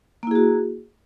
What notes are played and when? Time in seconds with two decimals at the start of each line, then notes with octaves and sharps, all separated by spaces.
0.23 A#3
0.27 E4
0.31 G#4
0.35 F#4